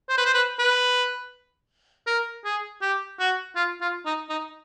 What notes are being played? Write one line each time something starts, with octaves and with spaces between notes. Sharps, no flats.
C5
B4
C5
B4
B4
A#4
G#4
G4
F#4
F4
F4
D#4
D#4